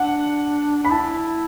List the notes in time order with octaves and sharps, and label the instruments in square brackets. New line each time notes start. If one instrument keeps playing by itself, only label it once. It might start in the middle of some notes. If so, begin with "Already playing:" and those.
Already playing: [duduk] D4 [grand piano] F#5
[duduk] D4 [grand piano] B5
[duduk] E4 [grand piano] A5